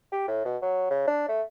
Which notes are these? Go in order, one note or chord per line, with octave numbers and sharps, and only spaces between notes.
G4
A2
B2
F#3
C#3
D4
A3